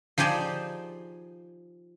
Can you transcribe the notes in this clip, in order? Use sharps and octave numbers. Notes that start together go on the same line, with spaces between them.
F3 D#4 G4 G#4 C5 D5